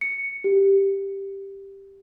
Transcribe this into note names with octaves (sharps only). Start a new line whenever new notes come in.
C#7
G4